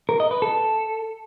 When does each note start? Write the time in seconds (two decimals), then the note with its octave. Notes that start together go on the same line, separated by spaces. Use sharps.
0.09 A#4
0.20 D#5
0.31 B4
0.42 A4